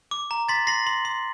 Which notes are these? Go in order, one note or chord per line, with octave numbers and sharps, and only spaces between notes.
D6
A#5
C6 A6 B6
C6 A#6 C7
C6
C6